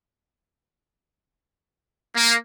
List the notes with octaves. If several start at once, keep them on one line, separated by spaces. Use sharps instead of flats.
A#3